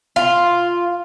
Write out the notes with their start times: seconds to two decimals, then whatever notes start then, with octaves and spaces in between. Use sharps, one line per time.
0.16 F4